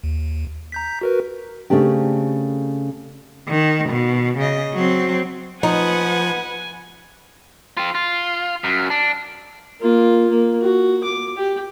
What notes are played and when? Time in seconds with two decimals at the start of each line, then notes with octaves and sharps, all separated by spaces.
0.04 D#2
0.72 A#5 G6 B6
1.01 F#4 A#4 B4
1.70 C#3 A3 C4 D4 G4
3.48 D#3
3.89 B2
4.37 C#3 D#5
4.74 F#3 C4
5.63 F3 D#4 B4 F#5 G#5
7.77 C4 F4
7.95 F4
8.64 F#2
8.90 D4
9.81 A#3 F4
10.30 A#3
10.62 F#4
11.03 D6
11.37 G4